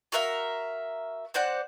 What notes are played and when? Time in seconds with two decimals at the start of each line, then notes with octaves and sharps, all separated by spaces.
0.12 F#4 A#4 E5 F5
1.34 C4 C5 D5 F#5